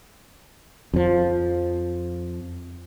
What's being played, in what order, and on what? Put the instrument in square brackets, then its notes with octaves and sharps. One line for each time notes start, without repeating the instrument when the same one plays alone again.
[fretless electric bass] F2 F3